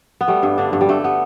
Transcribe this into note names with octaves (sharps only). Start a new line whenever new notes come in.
B3
G3 A3
G2
D3 D4
G2
G3
G2 A3
B3